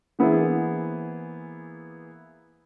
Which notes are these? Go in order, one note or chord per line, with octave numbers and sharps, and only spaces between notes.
E3 A#3 B3 E4 G#4 C5